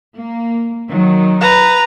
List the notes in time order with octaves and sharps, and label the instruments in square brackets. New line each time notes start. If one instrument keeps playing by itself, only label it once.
[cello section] A#3
D#3 F#3
[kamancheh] B4 A#5